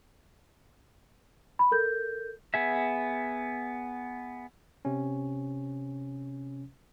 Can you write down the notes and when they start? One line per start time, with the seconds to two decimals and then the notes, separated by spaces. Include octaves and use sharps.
1.59 B5
1.71 A4 A#4 G6
2.54 B3 G#4 E5
4.85 C3 C#4